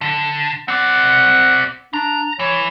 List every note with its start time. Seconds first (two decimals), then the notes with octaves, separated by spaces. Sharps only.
0.01 D3
0.68 C4 D5 F#5
1.94 D4 A#5
2.39 E3 C#5